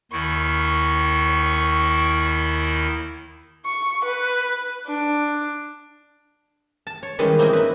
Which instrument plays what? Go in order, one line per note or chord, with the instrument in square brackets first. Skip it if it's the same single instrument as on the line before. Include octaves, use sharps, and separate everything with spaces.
[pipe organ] D#2 D#3 E4 [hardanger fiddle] C#6
[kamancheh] C#6
B4
D4
[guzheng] A5
C#5
D#3 E3 G3 G#3 C#4 B4
A#3 C4 D#4 E4 F#4 G#5
E4 B4